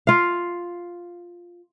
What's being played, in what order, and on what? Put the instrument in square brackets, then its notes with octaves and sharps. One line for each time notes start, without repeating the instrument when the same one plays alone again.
[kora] F4 F5